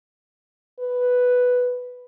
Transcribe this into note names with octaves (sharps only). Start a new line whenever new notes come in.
B4